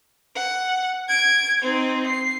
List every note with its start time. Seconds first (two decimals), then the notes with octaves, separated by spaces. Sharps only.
0.35 F#5
1.08 G#6 D7
1.61 C4 D#4
2.07 C7